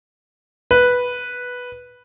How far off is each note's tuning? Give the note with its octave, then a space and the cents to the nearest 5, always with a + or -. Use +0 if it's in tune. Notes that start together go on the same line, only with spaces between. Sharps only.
B4 -5